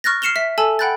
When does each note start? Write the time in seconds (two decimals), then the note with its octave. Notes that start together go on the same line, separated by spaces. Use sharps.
0.04 C#6 F6 F#6 A6 A#6
0.22 F6 C7 C#7 E7 F7 G7
0.36 E5 B6
0.58 A4 G#5 A5 E6 F#7
0.79 F#5 G5 B5 F#6 G6 A6